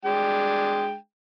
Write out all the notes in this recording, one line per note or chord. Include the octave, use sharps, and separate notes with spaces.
G#3 D4 G5